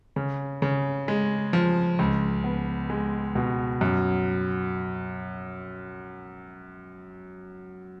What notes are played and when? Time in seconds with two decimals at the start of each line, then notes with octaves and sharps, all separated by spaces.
0.16 C#3
0.62 C#3
1.08 G#3
1.53 F3
1.99 C#2
2.44 B3
2.90 G#3
3.35 B2
3.81 F#2